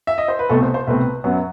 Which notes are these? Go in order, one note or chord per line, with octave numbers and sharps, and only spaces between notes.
E5
D#5
C5
B4
C2 B2 A3 C4 A4
C5
C5
C2 B2 A3 C4 B4
F#2 F#3 B3